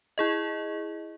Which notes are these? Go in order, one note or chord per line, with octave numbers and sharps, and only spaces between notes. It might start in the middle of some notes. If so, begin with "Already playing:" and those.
E4 G#4 D#5